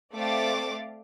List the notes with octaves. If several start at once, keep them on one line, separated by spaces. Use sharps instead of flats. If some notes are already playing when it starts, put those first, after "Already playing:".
A3 C4 D5 F5 D6 A6